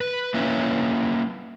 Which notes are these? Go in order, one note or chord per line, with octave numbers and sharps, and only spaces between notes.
B4
A#3 C#4 E4 B4 C#5 E5